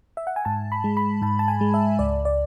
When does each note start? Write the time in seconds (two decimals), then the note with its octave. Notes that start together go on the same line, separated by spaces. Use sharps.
0.17 E5
0.27 F#5
0.36 G#5
0.45 G#2 A5
0.72 B5
0.84 G#3
0.97 B5
1.22 G#2 A5
1.39 A5
1.48 G#5
1.61 G#3
1.74 E5
1.99 C#2 D5
2.25 D5